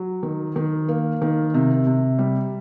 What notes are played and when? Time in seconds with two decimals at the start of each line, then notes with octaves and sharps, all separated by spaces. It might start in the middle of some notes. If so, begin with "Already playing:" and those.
Already playing: F#3
0.23 D#3
0.56 D#3
0.89 A#3
1.22 D#3
1.54 C3
1.87 C3
2.19 G3